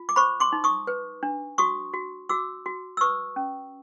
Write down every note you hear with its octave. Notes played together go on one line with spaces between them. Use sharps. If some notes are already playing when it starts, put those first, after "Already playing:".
Already playing: F4
D6
C5 B5 C#6
C6 D6
D#4
C#6 D#6
B4
D4
F#4 C#6 D#6
F#4
F#4 D6 E6
F#4
E6
B4 C#6 D#6
C#4